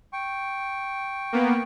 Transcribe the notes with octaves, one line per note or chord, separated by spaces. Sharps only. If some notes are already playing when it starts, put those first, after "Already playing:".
G5 C#6
A#3 B3